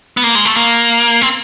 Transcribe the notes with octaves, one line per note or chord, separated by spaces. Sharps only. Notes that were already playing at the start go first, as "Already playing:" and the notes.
B3
A#3
G#3
A3
A#3
C4